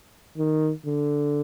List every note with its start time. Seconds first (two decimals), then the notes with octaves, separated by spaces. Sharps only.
0.38 D#3
0.86 D3